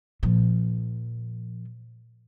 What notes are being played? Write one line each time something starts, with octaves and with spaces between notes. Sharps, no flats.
A#2 F3